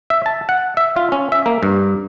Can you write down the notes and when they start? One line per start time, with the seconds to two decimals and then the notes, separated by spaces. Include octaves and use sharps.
0.10 E5
0.26 A5
0.49 F#5
0.77 E5
0.96 F4
1.12 C#4
1.32 E5
1.46 A#3
1.63 G2